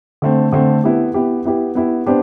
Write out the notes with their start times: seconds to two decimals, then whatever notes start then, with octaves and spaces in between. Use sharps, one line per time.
0.22 D3 A3 C4
0.53 D3 A3 C4
0.84 B3 E4 G4
1.14 B3 E4 G4
1.45 B3 E4 G4
1.75 B3 E4 G4
2.06 B3 D4 G4 C5